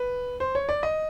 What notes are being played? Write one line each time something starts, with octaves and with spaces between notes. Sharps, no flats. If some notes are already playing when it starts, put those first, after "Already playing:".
Already playing: B4
C5
C#5
D5
D#5